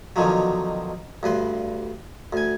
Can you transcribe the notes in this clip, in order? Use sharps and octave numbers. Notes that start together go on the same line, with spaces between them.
B2 D3 D#3 F3 F#3
D2 G2 B4 C6
D2 G#5